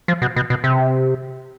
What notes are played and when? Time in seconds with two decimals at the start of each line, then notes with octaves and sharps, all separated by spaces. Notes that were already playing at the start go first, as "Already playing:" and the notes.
0.08 F3
0.22 B2
0.36 B2
0.50 B2
0.64 C3